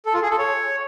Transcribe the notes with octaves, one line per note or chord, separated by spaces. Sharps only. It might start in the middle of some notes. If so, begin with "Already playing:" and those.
A4
F4
G#4
A4
C#5